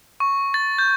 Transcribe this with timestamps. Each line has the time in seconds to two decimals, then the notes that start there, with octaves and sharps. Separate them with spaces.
0.20 C#6
0.54 A6
0.79 G6